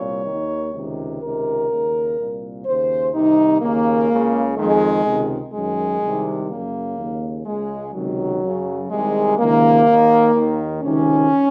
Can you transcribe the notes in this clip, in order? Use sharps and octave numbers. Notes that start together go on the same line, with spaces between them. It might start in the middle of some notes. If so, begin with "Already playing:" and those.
Already playing: C2 A#2 C#5
D#2 D#3
C#2 C3 D#3
C#2 C3 D#3 A#4
D#2 C#3
C2 A#2
D#2 C#3 C5
C2 C3 D#3 D#4
D#2 C#3 A#3
C#2 C#3
F2 D#3 G#3
C#2 C3 D#3
F#2 D#3 G#3
C2 C3 D#3
F#2 C#3 A#3
D#2 C#3
C#2 C#3 G#3
C#2 C3 D#3 F#3
F#2 C#3
C2 C3 D#3 G#3
C#2 C3 D#3 A#3
D#2 D#3
D#2 D#3
C#2 C3 D#3 C#4